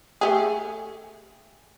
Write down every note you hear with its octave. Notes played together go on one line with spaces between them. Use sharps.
A3 G4 G#4